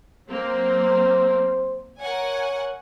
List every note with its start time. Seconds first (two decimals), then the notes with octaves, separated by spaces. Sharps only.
0.28 F#3 A#3 C4 C5
1.99 A#4 C#5 F#5 G#5